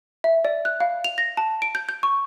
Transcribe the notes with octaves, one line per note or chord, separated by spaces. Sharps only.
E5
D5
F#6
F5
F7
A#6
A5
D7
G6
G6
C#6